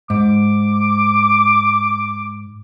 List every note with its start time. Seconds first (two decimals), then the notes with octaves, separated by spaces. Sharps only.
0.10 G#2 D6